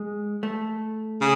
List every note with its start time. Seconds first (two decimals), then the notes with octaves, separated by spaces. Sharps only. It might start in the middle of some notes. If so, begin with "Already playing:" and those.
Already playing: G#3
0.43 A3
1.20 C#3